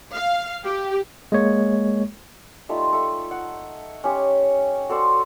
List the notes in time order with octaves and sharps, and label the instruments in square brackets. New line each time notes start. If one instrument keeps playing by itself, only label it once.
[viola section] F5
G4
[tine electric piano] G#3 A#3 C#5
[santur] G3 A3 D#4 F4
A3 A4
F#5
C#4 G4 C#5
F#4 A4 C5 D5